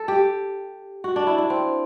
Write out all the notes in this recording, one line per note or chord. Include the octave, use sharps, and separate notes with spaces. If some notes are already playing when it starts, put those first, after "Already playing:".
Already playing: A4
G4
F#4
D4
E4
D4
C4